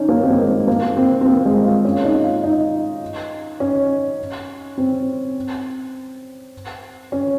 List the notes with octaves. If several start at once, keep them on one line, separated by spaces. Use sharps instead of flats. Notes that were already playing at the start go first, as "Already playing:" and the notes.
Already playing: C#4 D#4
A#3
C4
A#3
G#3
A#3
C4
C4
A#3
G#3
F4
C#4
D#4
F4
D#4
C#4
C4
C#4